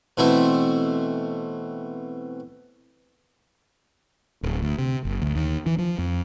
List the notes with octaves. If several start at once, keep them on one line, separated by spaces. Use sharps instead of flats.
B2 E3 A3 C4 E5
D1
D2
C3
F#1
D2
D#2
E3
F3
F2